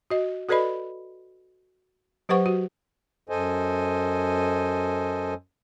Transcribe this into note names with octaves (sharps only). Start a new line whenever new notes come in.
F#4 D#5
F#4 A4 B4 D5 D#5 B5
F#3 G4 B4 C5 F#5 C#6
F#4
F#2 A4 C5 D#5 G#5